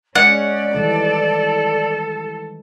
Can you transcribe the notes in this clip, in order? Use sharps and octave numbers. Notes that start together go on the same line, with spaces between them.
G#3 C#4 C#5 D5 F#5
D#3 E3 G3 A4